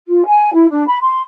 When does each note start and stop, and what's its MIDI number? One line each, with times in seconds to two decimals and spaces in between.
0.07 0.24 65
0.27 0.53 80
0.53 0.66 64
0.70 0.86 62
0.87 0.96 83
1.02 1.20 84